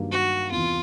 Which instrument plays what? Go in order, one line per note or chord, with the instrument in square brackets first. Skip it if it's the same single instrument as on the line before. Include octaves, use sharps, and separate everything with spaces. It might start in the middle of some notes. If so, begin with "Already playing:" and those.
Already playing: [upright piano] G2 D#3 F#3 A#3 D4
[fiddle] F#4
[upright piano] E2 C3 E3 [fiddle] F4